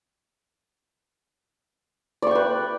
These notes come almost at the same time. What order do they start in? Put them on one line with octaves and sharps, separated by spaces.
D5 C#6 G5 B4